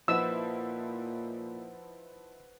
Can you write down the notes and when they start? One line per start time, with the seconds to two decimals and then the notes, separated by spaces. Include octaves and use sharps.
0.08 A#2 F3 D#4 E4 B4 C5 F#5 E6